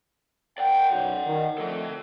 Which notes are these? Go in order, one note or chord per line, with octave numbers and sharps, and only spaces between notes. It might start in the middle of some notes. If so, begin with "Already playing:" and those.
A#4 D5 F#5 G5
B1 F#2
D#3
D3 F3 A3 A4 D#5